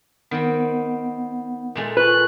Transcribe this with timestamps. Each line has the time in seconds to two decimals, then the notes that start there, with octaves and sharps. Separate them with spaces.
0.31 D#3 B3 C4 F#5
1.75 A#2 G#3 A3 A4
1.97 F4 B4 C#6 F#6